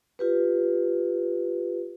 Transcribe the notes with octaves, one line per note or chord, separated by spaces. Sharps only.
F4 G4 B4